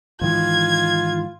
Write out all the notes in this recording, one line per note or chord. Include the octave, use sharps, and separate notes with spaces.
G#2 D#3 E3 F4 G#6